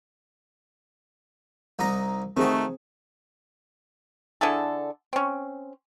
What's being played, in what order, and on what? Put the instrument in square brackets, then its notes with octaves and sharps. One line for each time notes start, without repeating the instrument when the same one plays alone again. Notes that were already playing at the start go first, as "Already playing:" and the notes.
[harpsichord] C2 D#4 A#5
[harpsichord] D#3 F#4 [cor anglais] A3 [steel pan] C4 G#4
[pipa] D3 E4 G#4 A4
C4 C#4